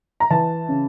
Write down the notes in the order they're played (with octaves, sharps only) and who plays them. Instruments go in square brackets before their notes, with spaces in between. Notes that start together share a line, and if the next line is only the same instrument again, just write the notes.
[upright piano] A#5
E3 A5
C#3